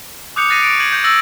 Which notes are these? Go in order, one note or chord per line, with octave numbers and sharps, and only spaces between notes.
D6 D#6 F#6 G6 C#7 F7
D6 F#6 A6 A#6 C7 D#7
C#6 A6 D7
G#6 D#7 F#7
G6 A#6
E6 F#6 A6 A#6 F#7